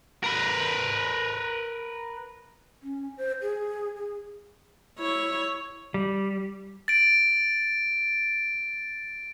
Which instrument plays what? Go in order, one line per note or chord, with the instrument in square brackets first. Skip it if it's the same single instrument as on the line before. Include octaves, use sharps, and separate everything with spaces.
[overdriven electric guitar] A#4 B4
[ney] C#4
C5
G#4
G#4
[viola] E4 C#5
[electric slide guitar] G3
[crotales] A6 D7